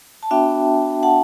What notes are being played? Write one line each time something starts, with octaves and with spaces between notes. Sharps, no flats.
A5
B3 D4 F#4 E5 G5
F#5 A5